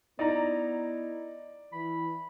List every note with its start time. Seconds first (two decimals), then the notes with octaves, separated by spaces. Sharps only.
0.19 B3 D#4 E4 D5 A#5
1.73 E3 B5